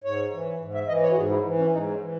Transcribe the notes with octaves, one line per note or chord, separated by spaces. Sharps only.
G#2 C#5
E3
G#2
E5
E3 D#5
C#5
F#4
G#2 G#4
E4
E3
C#4
G#2 D#4
C#4
E3